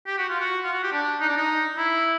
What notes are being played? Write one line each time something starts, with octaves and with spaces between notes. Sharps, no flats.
G4
F#4
F4
F#4
F4
F#4
G4
D4
D#4
D4
D#4
E4